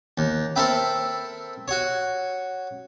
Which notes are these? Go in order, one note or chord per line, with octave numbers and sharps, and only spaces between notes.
D#2
C4 A4 A#4 E5 G5 B5
F#4 C#5